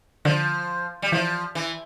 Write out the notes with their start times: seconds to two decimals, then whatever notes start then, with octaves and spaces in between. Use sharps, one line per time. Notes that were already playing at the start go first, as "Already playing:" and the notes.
0.25 D3 F3
1.02 G3
1.12 E3 F3
1.55 E3